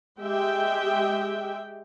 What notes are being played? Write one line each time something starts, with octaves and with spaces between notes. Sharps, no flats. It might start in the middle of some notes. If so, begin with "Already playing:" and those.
G#3 G4 E5 G5